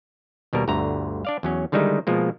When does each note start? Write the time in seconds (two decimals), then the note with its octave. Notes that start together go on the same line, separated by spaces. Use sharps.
0.53 D#2 B2 G3 A#4
0.68 G1 D2 D3 A#5
1.25 D4 D5 F5
1.43 E2 F#3 C#4
1.72 D3 D#3 G3 G#3 D#4 E4
2.07 B2 F3 G#3 A#3